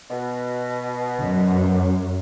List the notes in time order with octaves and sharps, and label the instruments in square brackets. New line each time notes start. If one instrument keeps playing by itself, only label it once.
[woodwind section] B2
[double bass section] F#2